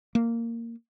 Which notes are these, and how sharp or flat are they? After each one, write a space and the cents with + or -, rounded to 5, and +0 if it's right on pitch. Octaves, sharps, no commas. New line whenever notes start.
A#3 -10